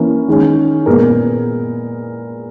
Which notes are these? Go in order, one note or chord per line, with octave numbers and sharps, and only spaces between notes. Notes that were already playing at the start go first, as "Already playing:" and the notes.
Already playing: E3 A#3 C#4
D#3 G#3 C#4
A#2 G#3 B3 A#4